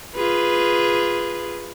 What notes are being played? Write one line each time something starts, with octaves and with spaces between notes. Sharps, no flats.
F4 G#4 B4